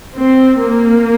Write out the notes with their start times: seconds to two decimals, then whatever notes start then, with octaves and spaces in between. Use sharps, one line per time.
0.17 C4
0.61 A#3